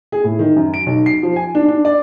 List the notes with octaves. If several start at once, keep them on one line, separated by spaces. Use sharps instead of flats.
G#4
A2
D#3
F#2
D7
B1
C7
F3
G#5
D4
D4
D5